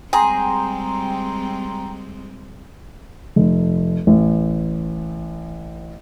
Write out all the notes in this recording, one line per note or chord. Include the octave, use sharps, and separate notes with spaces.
G3 G#3 C4 G#4 G5 A#5 C6
F1
A1